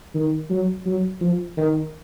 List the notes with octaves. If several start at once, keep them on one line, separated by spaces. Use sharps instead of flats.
D#3
F#3
F#3
F3
D#3